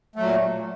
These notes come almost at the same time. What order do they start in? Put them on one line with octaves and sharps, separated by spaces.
A3 F#3 A#2